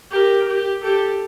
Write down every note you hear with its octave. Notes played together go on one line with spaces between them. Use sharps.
G4 A#4
G4
G4 A4